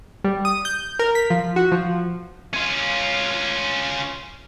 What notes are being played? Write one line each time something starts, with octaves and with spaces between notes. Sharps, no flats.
G3
D#6
G6
A#4
B6
F3
F#4
F3
C#4 F4